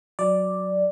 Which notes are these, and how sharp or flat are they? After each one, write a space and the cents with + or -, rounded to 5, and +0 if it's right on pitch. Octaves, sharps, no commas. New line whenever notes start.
F#3 +0 D5 +0